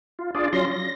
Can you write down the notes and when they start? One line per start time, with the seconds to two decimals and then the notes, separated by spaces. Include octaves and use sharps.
0.19 F4
0.35 D4 F4 G#4 D5
0.53 F#3 C#4 F4 C6 A#6
0.71 A#6